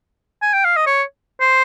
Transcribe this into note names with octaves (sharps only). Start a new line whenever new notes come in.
G#5
G5
F5
D#5
C#5
C5